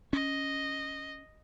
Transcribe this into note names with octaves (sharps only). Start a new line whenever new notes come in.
C#4 D#5